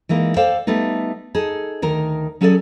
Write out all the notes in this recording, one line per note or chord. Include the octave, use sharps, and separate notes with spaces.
E3 G#3 A#3 D#4
A4 C5 D5 F5 G5
G3 A3 B3 D#4
D#4 G#4 A4
D2 D#3 A#4
F#3 C#4 G#4 A4 B4 D5